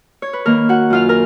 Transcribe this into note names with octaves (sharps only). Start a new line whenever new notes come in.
C#5
B4
D#3 A#3 A#4
F#4 F#5
F#2 F4 F5
A#4